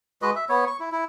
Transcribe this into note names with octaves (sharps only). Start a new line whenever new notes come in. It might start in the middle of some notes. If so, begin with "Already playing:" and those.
G#3 F#4 B4 D#5
E5
B3 C#5
C#6
E4
E4